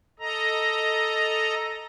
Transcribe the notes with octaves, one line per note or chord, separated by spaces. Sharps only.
A4 D#5 A#5